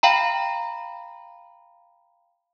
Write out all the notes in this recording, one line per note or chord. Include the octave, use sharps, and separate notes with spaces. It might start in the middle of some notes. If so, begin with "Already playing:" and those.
F5 G5 A#5 B5